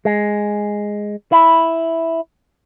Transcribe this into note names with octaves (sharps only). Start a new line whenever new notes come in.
G#3
E4